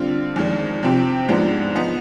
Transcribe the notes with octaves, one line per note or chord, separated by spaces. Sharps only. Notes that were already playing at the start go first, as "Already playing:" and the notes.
Already playing: D3 G3 C4 F4
F2 D#3 G#3 D4
C3 F3 C4 G4
G#2 F3 G#3 B3 D4
F3 B3 D#4